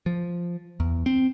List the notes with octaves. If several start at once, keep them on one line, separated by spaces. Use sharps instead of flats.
F3
E2
C4